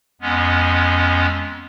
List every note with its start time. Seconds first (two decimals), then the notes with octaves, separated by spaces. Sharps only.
0.21 F2 G#3 B3 C#4